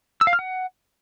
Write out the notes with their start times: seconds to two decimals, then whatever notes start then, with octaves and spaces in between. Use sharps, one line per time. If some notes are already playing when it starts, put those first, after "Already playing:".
0.21 E6
0.27 F5
0.33 F6
0.39 F#5